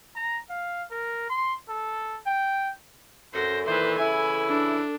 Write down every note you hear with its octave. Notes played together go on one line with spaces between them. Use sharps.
A#5
F5
A#4
C6
A4
G5
F#2 A4 C5 A#6
A#2 D#3 E3 B4 C5
C#3 E3 E4 G#5
D4